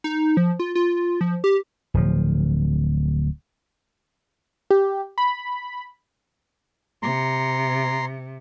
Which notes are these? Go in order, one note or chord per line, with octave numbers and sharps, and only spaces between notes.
D#4
F3
F4
F4
F3
G4
D1 F3
G4
B5
C3 A#5 C6